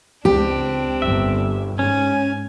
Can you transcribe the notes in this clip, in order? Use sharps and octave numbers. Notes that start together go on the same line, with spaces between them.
C#2 C4 D4 G4
G1 E5
G#2 C#4 G#5